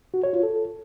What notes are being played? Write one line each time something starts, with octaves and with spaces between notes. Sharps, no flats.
F#4
C#5
F4
A4